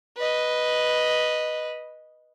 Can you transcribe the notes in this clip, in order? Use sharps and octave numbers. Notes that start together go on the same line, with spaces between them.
B4 D#5